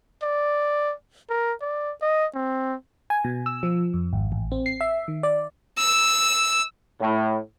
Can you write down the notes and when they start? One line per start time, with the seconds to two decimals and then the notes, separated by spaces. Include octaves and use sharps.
0.23 D5
1.30 A#4
1.62 D5
2.02 D#5
2.35 C4
3.10 G#5
3.24 B2
3.46 E6
3.63 F3
3.94 F2
4.13 G#1
4.32 A1
4.52 C4
4.66 C7
4.81 E5
5.08 D#3
5.23 D5
5.78 E6
7.00 A2